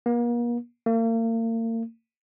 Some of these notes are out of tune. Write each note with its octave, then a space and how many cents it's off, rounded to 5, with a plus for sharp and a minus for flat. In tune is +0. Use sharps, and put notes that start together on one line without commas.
A#3 +40
A#3 -40